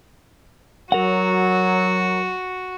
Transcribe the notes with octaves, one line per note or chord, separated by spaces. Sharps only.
F#3 F#4 A#4 F#5